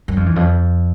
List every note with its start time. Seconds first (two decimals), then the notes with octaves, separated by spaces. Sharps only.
0.08 F#2
0.16 F2
0.26 E2
0.36 F2